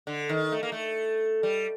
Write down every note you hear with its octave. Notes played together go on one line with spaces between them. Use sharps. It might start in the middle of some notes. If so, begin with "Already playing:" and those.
D3
D#3
A3
A#3
A3
G3